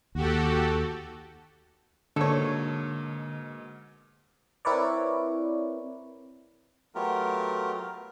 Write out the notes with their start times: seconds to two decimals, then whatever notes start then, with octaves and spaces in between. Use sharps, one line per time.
0.15 D#2 F#4 G4 A4
2.16 G#2 B2 D3 A#3 A4 C#5
4.65 C4 E4 A#4 B4 C#5 D5
6.95 F#3 A3 B3 F4 G4 A#4